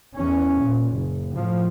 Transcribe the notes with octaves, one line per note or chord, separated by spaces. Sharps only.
E2 C#4
A#2
F#1
A2 F3